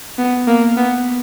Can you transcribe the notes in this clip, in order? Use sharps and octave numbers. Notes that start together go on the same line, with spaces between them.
B3
A#3
B3